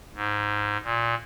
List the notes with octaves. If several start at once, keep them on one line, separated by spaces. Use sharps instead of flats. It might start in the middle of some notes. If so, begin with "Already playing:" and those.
G#2
A#2